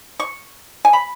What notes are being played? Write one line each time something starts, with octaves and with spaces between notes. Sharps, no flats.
C#6
G#5
B5